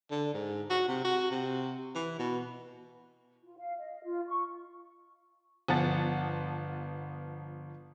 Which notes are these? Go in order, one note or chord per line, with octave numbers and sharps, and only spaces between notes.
D3
G#2
F#4
C3
F#4
C3
E3
B2
F4
F5
D#5
F4
C#6
G1 F3 B3 F#5 A5 A6